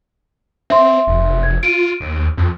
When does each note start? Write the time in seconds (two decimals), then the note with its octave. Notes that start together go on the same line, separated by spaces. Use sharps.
0.70 C4 E5 C6
1.07 F1
1.43 G#6
1.63 F4 D7 D#7
2.00 D#2
2.37 F2